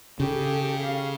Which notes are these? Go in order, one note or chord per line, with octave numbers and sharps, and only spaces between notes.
C#3 G4 A4
F5